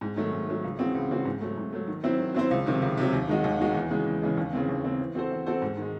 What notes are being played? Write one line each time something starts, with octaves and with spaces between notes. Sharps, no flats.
G#2
D#3 F#3 A3
G#2
D#3 F#3 A3
C#2
C#3 E3 C4 F#4
C#2
C#3 E3 C4 F#4
G#2
F#3 A3
G#2
F#3 A3
D#3
F#3 C4 E4 C5
D#3
F#3 C4 E4 C5
C#2
C3 D#3 F#3
C#2
C3 D#3 F#3
D#2
D#3 G#3 D#4 F#4
D#2
D#3 G#3 D#4 F#4
E2
C#3 E3 G#3
E2
C#3 E3 G#3
D#2
C#3 E3 C4
D#2
C#3 E3 C4
E3
C4 F#4 A4 C5
E3
C4 F#4 A4 C5
G#2
D#3 G#3